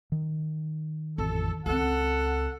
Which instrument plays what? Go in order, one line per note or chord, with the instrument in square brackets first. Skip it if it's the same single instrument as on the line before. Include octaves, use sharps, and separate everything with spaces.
[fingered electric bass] D#3
[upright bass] A1 F2 [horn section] A4
[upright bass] C#2 C4 [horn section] A4 F#5